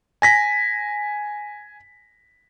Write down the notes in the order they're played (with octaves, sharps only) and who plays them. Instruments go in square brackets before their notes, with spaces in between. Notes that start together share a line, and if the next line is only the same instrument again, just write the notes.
[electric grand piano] G#5 A#6 B6